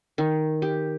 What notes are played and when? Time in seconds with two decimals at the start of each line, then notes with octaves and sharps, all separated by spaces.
0.18 D#3
0.62 G4